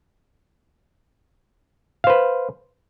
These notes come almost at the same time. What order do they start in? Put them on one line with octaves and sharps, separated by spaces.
F5 C5 B4